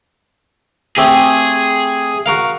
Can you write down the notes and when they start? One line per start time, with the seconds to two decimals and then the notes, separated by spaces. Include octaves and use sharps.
0.98 A3 C4 G4 G#4
2.26 F#4 A#4 F5